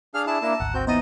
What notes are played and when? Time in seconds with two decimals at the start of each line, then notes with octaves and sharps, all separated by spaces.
0.14 D4 G#4 F5 F6
0.27 D4 E4 G#4 A5
0.42 A#3 D4 E4 E5 A#5 E6
0.60 G#1 D2 F#5
0.74 C4 F#4 G6
0.87 E3 B3 D#4 C5 D#5 A6